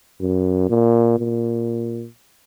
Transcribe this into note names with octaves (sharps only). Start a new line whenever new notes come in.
F#2
A#2
A#2